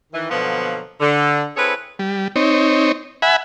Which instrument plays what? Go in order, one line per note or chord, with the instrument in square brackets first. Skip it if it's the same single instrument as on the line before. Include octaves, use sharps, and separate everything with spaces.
[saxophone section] D#3 E3
B2 D3 F3 F#3 A#3 B3
D3
C4 E4 G#4 A4 B4 C#5
[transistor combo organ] G3
C4 D#4 C#5
E5 F#5 G#5 B5